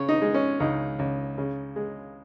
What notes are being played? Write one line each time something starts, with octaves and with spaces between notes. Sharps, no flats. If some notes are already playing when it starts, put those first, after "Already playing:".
Already playing: C#3 C#5
D#4
G#3
C#4
C#2 D#4
C#2
C#3
G#3